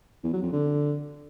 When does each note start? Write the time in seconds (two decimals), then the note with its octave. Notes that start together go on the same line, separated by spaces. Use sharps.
0.24 E2
0.33 F#3
0.43 F2
0.53 D3